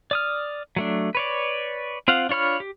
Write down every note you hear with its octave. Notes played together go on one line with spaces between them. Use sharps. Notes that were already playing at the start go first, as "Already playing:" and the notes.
D5 D#6 F6
F#3 A3 D4
B4 C#5 D5
C4 F4 F5 F#5
D4 F4 C#5 B5 F6
G4